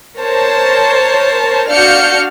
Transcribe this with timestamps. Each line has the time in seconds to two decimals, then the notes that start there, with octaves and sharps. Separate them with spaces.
0.19 A#4 C5 C#5 A5
1.69 D4 F#4 F5 F6 G6 C#7